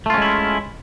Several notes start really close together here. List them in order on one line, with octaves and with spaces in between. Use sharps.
A3 F4 C#4 G#3 E4